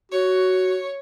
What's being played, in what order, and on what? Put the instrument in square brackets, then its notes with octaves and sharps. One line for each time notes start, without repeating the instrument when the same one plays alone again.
[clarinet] F#4 [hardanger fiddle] C#5